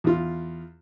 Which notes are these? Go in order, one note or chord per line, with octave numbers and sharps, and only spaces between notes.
E2 F4